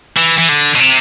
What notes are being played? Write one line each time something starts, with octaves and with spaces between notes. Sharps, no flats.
E3
E3
D3
B2
C3